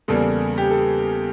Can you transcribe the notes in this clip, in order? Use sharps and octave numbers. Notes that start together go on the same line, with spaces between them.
E2 C#3 G3 A#3 A4
G4
A4